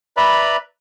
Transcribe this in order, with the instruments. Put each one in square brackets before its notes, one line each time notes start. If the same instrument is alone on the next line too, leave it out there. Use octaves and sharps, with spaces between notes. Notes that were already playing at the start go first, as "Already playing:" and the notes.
[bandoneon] B4 D5 E5 A#5 B5